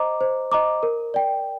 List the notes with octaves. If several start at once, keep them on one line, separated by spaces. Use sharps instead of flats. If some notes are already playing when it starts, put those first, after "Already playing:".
Already playing: C5 D#5 A#5 D6
C5
D#5 A#5 D6
A#4
D5 G5